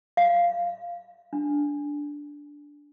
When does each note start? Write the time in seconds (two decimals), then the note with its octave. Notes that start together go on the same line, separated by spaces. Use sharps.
0.17 F5
1.33 D4